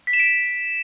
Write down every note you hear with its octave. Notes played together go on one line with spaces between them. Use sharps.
B6
E7
D7